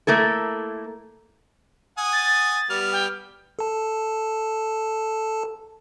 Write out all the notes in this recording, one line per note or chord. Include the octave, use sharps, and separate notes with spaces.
A3 A#3 E4 A4
F#5 G#5 D#6
A6
G3 B3 F6
G5
A4 A5